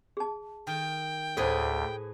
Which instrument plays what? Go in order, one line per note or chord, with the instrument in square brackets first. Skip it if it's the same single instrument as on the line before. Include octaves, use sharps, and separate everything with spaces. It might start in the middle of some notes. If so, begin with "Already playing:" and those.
[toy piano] G#4 A5
[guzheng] D#3 [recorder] G5
[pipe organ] D2 [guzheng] A2 G#4 B4 [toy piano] A4 C5